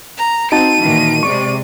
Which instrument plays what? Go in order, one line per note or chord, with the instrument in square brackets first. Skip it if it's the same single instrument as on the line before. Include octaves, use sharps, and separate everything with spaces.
[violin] A#5
[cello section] C4 [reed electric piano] D#4 F#4 A5 [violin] D#7
[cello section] A#2 D#3 E3
[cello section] C3 G#3 D5 [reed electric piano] C#6